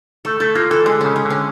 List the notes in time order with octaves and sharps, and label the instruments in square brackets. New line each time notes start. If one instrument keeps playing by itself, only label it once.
[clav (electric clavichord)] A3 [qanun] A4
[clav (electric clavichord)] A3 [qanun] A4
[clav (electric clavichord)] A#3 [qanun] F4
[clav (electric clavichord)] E3 [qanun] A4
[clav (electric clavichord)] D3 [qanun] G#3
[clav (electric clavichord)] C#3 [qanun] C#4
[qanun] G#3
[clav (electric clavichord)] D3
[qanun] C#4